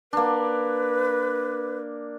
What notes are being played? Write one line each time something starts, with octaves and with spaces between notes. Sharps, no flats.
A#3 D4 B4